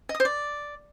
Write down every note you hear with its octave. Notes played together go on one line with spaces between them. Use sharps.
D#5
D#6
C5
D5